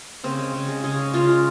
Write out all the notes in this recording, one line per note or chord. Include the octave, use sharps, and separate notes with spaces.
C#3 C4
G#3
C#3
G#3
C#3 G#4
G#3
C#3 F4
G#3